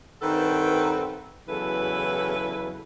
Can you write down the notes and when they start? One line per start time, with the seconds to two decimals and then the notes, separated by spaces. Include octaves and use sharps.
0.22 G2 D#3 C4 A4 B4 F#5
1.48 E2 C#3 F#3 E4 A4 B4